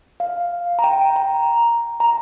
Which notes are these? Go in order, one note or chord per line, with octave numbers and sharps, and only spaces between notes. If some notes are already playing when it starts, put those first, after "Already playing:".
F5
A#5
G5
A#5
A#5